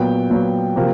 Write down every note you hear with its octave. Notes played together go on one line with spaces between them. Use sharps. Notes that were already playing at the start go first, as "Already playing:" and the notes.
Already playing: A#2 F#3 B3 G5
A#2 F#3 B3
C3 F3 A#3